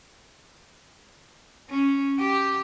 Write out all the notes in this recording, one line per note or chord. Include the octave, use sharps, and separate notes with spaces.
C#4
G4 G5